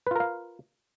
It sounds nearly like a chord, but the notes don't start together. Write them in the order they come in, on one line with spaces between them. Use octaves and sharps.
B4 F4 A#4 F5